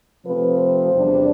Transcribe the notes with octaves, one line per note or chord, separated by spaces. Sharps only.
C3 F3 A3 C4 B4
C5
E2 C3 G3 D4